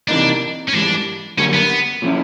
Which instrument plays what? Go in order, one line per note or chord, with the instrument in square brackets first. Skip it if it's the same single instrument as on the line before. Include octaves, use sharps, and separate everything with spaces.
[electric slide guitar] C3 E3 G3 A#3 D#4 [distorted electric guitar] D4
[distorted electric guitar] C#4
[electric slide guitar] G#2 E3 G3 [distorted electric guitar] D4
[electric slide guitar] F#2 D3 G3 A#3 [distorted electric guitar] C#4
[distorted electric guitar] B3
[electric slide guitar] A#2 F3 G#3 C#4 E4